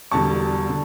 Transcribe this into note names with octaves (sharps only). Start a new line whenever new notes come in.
E1 E2 D3 G3 A5 C#6
D3